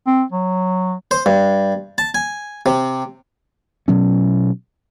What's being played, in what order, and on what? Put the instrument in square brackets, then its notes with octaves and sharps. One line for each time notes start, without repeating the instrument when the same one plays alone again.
[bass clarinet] C4
F#3
[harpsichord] C5
G2
A5
G#5
C3
[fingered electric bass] B2 F#3 C#4